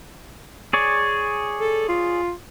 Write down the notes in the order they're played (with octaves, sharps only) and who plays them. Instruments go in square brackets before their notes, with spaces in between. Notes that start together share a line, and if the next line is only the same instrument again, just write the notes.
[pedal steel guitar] G#4 C#5 D5
[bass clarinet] A4
F4